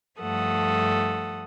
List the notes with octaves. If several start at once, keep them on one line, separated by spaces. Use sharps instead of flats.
G2 F3 A3 A4 F#5 D#6